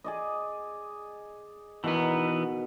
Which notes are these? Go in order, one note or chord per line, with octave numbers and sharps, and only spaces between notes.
G#4 D5 D#5
B2 D#3 E3 B3 A#5